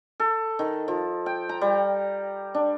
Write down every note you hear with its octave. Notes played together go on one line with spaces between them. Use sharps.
A4
D#3
F3
G5
A#5
G3
D4